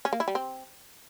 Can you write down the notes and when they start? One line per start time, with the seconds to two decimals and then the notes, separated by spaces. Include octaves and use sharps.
0.05 C#4
0.13 A#3
0.20 E4
0.28 G3
0.35 C4